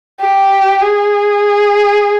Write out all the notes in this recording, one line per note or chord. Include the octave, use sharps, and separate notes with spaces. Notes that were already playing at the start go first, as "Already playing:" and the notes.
G4
G#4